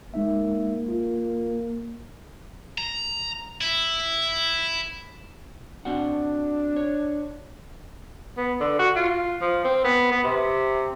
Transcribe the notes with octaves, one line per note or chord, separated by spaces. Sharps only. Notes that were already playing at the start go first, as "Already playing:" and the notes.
G#3 A#3 D#4 E5
F4
A#5
E4
C4 D4 F#4 F#5
C#5
B3
D3
F#4
F4
F3
C4
B3
B3
C3